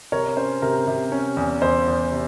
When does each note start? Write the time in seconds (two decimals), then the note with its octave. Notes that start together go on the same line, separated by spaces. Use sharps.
0.12 C3 A#4 C#5
0.37 C#4 C5
0.62 C3 A#4
0.87 C3
1.12 C#4
1.37 E2
1.62 E2 C5
1.88 E2
2.12 C3